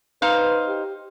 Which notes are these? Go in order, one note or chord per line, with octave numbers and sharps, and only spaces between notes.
D#4 B4 C5 F5
G4